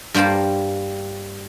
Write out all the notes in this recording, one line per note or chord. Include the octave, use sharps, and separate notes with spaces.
G2 G3 A#3 C5 A5